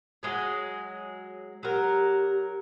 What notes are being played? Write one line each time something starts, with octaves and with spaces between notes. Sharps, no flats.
F#3 G#3 G#4
F#3 G4 A#4